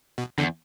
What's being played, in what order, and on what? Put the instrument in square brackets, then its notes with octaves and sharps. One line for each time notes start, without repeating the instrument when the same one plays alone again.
[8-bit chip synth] B2
[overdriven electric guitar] E2 [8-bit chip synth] D3